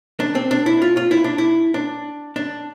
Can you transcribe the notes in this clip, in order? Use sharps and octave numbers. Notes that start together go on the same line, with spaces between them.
D4
C4
D4
E4
F4
F4
E4
D4
E4
D4
D4